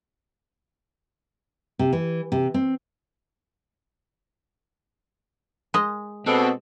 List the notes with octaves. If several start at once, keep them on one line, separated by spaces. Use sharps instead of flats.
C3
E3
C3
C4
G#3 D#5
B2 C4 D4 G#4 A4